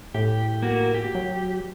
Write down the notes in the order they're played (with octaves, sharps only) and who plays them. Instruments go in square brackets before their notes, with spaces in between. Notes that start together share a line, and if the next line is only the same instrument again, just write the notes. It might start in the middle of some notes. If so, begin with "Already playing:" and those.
[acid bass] A2 [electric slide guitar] G4
[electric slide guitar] A#3 F#4
G4
[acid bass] F#3